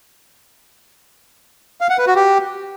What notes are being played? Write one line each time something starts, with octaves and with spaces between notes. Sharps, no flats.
F5
F#5
B4
F#4
G4